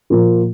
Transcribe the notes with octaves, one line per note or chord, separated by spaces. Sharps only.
A#2 F3 A#3 F4